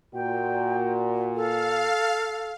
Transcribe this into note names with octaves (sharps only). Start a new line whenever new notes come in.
A#2 F#4 G5
A4 F5